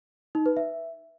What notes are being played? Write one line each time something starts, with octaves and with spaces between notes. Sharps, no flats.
D#4
B4
E5